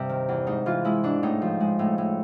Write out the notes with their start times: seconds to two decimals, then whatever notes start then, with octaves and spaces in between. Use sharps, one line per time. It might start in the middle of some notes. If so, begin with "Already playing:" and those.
Already playing: G2 C3
0.09 D#3
0.29 E2
0.47 G#2 D#4
0.66 E3 F4
0.85 G#3 E4
1.04 G#2 D4
1.23 A2 D#4
1.42 F3
1.60 G#3
1.79 A2
1.98 A2